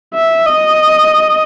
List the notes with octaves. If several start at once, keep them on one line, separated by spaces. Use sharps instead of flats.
E5
D#5